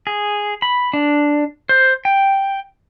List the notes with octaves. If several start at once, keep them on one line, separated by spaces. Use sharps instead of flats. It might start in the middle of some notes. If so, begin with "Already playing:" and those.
G#4
B5
D4
C5
G5